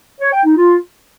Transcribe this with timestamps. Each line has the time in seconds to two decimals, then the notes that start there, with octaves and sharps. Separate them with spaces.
0.21 C#5
0.33 G5
0.44 D#4
0.56 F4